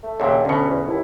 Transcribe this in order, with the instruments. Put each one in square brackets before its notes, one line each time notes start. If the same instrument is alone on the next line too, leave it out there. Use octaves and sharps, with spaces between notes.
[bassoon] A3
[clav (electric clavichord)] D#2 A#2 [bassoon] C#3 [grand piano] E5 F#5 G5
[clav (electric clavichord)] D2 B2 [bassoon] D3 [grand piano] C#4 C#7
[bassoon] E2
[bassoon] D#2 [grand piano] E4